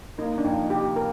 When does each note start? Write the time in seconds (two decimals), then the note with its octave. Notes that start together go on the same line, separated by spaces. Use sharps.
0.18 A#3 D#4
0.38 D4
0.44 F2 D#4
0.70 C3 G4
0.96 A#4